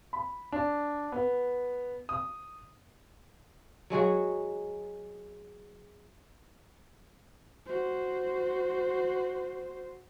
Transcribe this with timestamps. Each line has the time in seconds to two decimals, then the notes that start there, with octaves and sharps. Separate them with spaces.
0.13 B5
0.52 D4
1.12 B3
2.09 D#6
3.90 F#3 G#3 F#4 G#4
7.66 F#4 C5